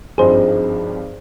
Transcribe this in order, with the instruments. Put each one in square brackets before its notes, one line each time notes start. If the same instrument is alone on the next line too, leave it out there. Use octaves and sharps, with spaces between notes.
[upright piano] G#1 G2 F3 C4 D#4 [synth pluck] G#4 C5